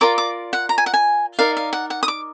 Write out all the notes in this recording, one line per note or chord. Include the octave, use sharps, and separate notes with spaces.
F4 A#4 D5 D6
D6
F#5
A#5
G#5
F#5
G#5
D#4 A#4 D5 F5
F5
F#5
F#5
D#6
D6